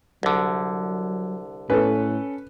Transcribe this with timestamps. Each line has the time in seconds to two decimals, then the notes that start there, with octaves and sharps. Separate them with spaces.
0.23 C2 D3 F#3
1.70 A2 C#4 A4 B4